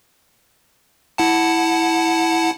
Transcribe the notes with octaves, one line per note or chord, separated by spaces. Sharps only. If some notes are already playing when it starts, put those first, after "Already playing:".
E4 F#5 A5